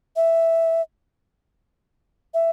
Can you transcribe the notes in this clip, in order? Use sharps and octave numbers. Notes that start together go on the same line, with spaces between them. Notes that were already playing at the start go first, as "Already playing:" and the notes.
E5
E5